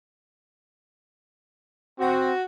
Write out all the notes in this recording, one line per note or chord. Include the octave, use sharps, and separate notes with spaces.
C4 F#4